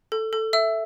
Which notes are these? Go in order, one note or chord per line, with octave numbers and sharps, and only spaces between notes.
A4
A4
E5 E6